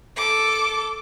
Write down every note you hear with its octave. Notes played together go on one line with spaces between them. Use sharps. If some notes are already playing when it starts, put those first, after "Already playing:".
A4 D6